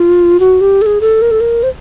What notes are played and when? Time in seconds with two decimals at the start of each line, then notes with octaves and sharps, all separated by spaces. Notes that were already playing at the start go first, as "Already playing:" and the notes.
Already playing: F4
0.40 F#4
0.61 G4
0.82 A4
0.86 G#4
1.01 A4
1.22 A#4
1.31 A4
1.41 A#4
1.63 C5